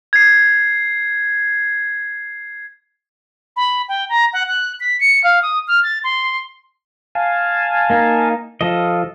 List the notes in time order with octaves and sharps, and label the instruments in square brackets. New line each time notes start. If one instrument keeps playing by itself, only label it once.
[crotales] G#6 C7
[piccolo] B5
G5
A#5
F#5
F#6
B6
C#7
F5
D#6
F6
A6
C6
[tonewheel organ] F5 G#5 A5
[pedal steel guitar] A#3 D#4
[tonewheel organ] F3 [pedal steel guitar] F4 A4 D#5